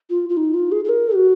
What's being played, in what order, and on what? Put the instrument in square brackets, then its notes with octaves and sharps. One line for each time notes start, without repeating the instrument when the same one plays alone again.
[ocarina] F4
F4
D#4
F4
G#4
G#4
A#4
F#4